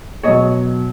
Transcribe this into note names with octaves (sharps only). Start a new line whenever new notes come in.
B2 F#3 C#5 D#5